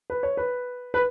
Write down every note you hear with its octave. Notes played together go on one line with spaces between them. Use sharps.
B4
C#5
B4
B4